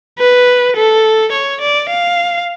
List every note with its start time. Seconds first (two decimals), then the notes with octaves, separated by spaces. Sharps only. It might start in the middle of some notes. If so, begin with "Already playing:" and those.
0.19 B4
0.76 A4
1.32 C#5
1.61 D5
1.89 F5